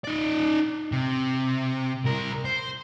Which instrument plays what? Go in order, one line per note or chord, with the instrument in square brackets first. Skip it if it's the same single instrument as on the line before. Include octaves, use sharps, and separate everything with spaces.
[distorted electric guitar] D#4 D5
C3
C2 A#4
C5